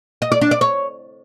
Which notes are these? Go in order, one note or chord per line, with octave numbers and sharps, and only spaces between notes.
D#5
D5
D4
D5
C#5